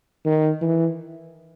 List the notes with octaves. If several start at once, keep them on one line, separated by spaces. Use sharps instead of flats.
D#3
E3